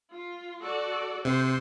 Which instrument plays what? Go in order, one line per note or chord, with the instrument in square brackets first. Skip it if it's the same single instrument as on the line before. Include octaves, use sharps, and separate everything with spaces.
[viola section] F4
F#4 A4 D5
[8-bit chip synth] C3 [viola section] C5